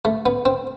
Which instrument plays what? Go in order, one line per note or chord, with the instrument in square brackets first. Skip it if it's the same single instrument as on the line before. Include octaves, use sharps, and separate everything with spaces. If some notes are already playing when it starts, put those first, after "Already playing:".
[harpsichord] A3
B3
C4